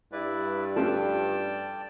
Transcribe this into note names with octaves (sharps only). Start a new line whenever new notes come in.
G2 E4 B4 D5
F3 A3 C#4 D5 G5 A5